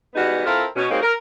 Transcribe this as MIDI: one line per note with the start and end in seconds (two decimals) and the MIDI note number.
0.15 0.41 52
0.15 0.41 55
0.15 0.41 56
0.15 0.41 59
0.15 0.41 63
0.15 0.41 66
0.45 0.65 60
0.45 0.65 64
0.45 0.65 65
0.45 0.65 69
0.45 0.65 70
0.76 0.88 47
0.76 0.88 61
0.90 0.98 54
0.90 0.98 56
0.90 0.98 58
0.90 0.98 60
0.90 0.98 63
0.90 0.98 67
1.02 1.13 70